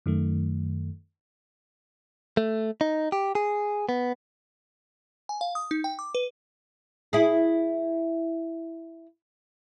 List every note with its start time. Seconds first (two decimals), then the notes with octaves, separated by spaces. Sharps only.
0.06 F#2 D#3 A3
2.37 A3
2.81 D#4
3.12 G4
3.35 G#4
3.89 B3
5.29 G#5
5.41 F5
5.55 D#6
5.71 D#4
5.84 G5
5.99 D6
6.15 B4
7.13 E4 G#4